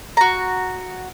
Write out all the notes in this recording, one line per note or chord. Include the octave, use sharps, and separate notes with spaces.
F#4 A#5